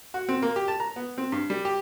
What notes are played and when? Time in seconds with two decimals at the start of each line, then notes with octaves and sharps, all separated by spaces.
0.14 F#4
0.29 C4
0.42 A#3
0.56 G4
0.68 A5
0.80 A#5
0.96 B3
1.18 C4
1.32 G2
1.50 G3
1.65 G4